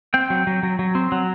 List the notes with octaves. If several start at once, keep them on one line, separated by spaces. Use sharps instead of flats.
C4 G5
F#3
F#3
F#3
F#3
C4
F#3